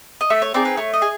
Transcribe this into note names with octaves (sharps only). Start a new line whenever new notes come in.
D#5
A3 E5
C#5
C4 D#4 G#4 D5
B4
A3 C#5
D#5
G#4